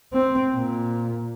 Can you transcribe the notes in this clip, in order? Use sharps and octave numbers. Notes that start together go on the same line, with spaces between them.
C4
A#2